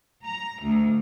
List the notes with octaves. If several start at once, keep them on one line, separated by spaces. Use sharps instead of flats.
A#5
D2